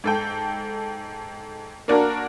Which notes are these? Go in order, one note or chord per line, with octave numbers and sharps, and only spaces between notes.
G#2 A4 G5
A#3 D4 F#4 A#4